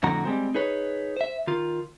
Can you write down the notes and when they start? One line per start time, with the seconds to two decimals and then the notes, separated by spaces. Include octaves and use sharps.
0.03 F2 A2 D3 F#4 A#5
0.25 G3 G#3 C4
0.54 D#4 G#4 B4 C#5
1.17 C5 E5
1.47 D#3 F4